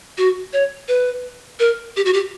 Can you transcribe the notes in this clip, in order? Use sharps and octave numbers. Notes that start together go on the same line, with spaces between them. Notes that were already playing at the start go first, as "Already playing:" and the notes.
F#4
C#5
B4
A#4
G4
F#4
G4